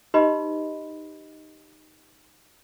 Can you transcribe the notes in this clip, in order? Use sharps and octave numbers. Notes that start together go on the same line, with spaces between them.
D#4 G4 B4 D#5 B5 C6